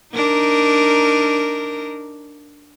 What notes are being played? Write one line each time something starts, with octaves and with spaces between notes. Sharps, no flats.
D4 D#4 A#4